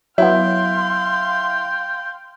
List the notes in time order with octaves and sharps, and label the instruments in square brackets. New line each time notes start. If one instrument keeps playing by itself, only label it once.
[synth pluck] F#3 B3 [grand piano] E4 [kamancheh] F5 C6 [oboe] G5